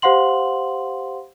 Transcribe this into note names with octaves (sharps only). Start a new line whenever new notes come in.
G4 C5 F5 F#5 C6 F#7